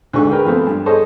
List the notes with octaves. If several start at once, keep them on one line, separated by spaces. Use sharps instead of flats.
D2 G#2 A4 C#6
G#4 A#4 B4 G5
F3 A3 B3 C4
G2
G#4 A4 C5 C#5 D#5 A5